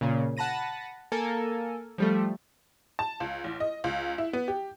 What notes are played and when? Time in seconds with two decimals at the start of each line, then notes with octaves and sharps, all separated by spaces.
0.01 A#2 C#3
0.37 F#5 A5 B5 A#6 D#7
1.12 A#3 A4 A#4 G#5
1.98 F3 G3 A3
2.99 A5
3.20 C#2
3.44 A1
3.60 D#5
3.84 C#2
4.18 E4
4.33 B3
4.48 G4